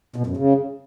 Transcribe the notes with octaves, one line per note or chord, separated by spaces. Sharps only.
B2
F#2
C#3